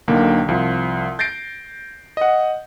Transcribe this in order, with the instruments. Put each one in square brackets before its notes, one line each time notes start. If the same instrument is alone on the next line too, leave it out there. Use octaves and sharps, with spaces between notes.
[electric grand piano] B1 D3 D#3 A#3
C2 F3
G6 A6 A#6 C7 D7
D#5 F#5